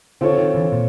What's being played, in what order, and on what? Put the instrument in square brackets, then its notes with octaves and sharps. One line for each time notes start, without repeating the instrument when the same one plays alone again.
[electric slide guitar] D3 [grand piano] C4 F4 A4 C#5
[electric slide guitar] D#3
D3 E3
A#2